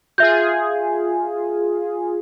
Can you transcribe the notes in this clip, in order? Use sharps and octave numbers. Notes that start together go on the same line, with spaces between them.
F4 G#4 E5 G6